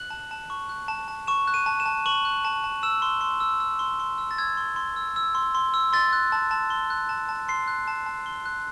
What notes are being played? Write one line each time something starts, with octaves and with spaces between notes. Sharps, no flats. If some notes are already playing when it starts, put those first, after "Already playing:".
Already playing: F#6 F#7
A5
A5
C#6
F#6
A5
A5
C#6 E7
F#6
D#7
A5
E7
A5
C#6 F#7
F#6
A5
A5
E6 E7
C6
C6
E6
E6
C6
C6
E6
A6
E6 G#6
C6
C6
E6
E6
C6
C6
E6
C6 A6
F#6
A5
A5
C6
F#6
A5
A5
C6 C7
F#6
A5
A5
C6
F#6